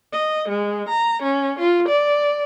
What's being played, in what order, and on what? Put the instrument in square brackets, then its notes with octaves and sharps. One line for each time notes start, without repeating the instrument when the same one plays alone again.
[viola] D#5
G#3
A#5
C#4
F4
D5